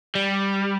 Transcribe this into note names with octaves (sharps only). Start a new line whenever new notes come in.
G3